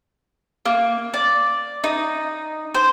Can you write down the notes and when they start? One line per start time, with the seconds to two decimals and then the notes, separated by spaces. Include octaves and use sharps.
0.66 A#3
1.14 D5
1.84 D#4
2.74 C5